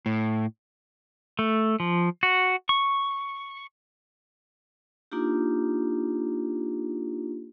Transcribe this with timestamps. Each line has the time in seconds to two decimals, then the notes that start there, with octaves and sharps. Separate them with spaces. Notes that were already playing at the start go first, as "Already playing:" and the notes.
0.06 A2
1.39 A3
1.80 F3
2.23 F#4
2.69 C#6
5.12 A#3 D4 D#4 F4 G4